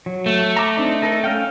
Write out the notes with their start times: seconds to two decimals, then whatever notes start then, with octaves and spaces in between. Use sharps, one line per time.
0.06 F#3
0.26 A3
0.57 A#5 D6
0.77 C4 D4 D#4
1.02 D#4 A4 A#4
1.24 C#4 F5 G5